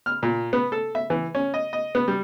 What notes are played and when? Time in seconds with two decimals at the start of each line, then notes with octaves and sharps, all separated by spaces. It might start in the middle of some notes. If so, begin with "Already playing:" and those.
0.06 F6
0.23 A#2
0.53 B3
0.72 A4
0.95 E5
1.10 E3
1.35 C#4
1.54 D#5
1.73 D#5
1.95 B3
2.08 G3